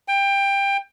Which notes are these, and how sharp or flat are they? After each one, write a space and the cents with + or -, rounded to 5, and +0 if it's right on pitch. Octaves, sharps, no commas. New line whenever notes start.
G5 +20